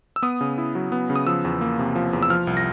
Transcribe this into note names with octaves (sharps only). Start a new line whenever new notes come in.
E6
B3 D#6
C#3
E4
F#3
B3
C#3
D#6
F3 E6
E2
A#3
C3
F3
E2
E6
F3 F6
C2
A#6